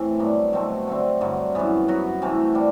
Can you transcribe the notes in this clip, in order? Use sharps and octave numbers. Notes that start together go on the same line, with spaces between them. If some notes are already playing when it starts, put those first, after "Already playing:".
Already playing: A2 E3 A3 C4
G2 F#3 B3 D4
B2 F#3 A3 C4
D3 A3 C4
G2 D3 F#3
F#2 E3 B3
F#3 B3 F#4
C3 E3 A3
G3 D4